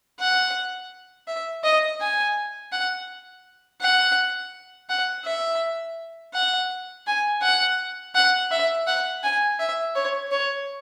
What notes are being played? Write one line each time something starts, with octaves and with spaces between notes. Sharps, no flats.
F#5
E5
D#5
G#5
F#5
F#5
F#5
E5
F#5
G#5
F#5
F#5
E5
F#5
G#5
E5
C#5
C#5